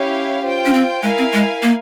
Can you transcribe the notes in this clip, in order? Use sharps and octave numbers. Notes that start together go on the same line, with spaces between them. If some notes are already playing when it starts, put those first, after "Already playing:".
Already playing: C#4 E4 G4 C#5 F5
F4 C5 G5
C#4
C4
G#3 E4 A#4 F5 G#5
C4
G#3
A#3